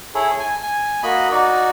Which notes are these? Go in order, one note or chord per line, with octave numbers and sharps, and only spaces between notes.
E4 G#4 A4 C#5
G#5
G#5
A#3 F#4 D#5 B5
D#4 F#4 D5